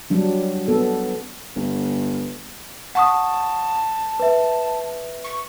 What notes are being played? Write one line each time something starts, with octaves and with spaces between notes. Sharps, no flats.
F#3 G3 D4
B3 A4
G1
F#5 A5 C#6 D#6
B4 E5
C#6